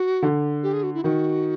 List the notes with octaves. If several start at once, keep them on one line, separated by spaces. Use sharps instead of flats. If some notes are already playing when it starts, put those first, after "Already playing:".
Already playing: F#4
D3
G4
G#4
F#4
E4
D#3 F#4